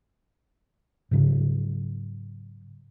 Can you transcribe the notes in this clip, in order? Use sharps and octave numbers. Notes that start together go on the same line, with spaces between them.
G#2 C#3 F#3